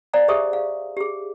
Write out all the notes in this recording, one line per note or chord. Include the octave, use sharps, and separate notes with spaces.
C5 D5 F5 G#5 A#5
G4 G#4 C5 E5 C#6 D#6
F5
G4 G#4